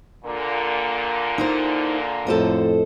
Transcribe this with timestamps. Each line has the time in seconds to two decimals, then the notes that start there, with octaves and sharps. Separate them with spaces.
0.24 A#2 D3 A#3
1.38 D#4 E4 C5
2.27 F2 A2 A4 C5 D#5